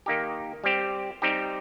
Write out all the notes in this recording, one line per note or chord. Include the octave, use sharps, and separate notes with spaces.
D#3 A#3 D#4 G4
G3 C4 G4
G3 C4 D#4 G4